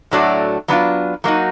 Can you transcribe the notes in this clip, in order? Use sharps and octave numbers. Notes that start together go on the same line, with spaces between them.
A2 F#3 A3 D4 F#4
F#3 B3 D4 F4
F#3 A#3 D#4 F#4